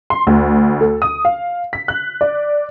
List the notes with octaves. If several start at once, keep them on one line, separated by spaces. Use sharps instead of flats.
C6
D2
A4
D#6
F5
B6
F#6
D5